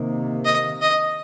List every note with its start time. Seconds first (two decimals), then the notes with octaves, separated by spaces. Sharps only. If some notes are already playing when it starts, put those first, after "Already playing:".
Already playing: C3 D#3 A#3
0.45 D#5
0.81 D#5